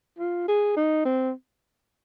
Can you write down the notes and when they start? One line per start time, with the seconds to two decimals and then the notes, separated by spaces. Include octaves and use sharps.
0.19 F4
0.48 G#4
0.76 D#4
1.05 C4